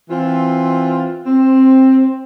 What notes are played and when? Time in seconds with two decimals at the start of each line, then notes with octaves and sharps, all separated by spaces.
0.10 E3 C4 F4
1.25 C4